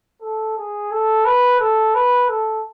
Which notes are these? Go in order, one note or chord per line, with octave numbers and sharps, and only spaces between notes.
A4
G#4
A4
B4
A4
B4
A4